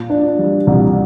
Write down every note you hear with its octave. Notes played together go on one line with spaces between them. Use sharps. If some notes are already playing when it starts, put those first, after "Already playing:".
Already playing: A#2
D4
G3
C2